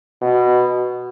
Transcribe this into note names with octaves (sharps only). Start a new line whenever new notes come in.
B2